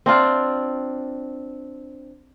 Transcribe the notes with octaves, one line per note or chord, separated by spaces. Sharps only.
C4 D4 F4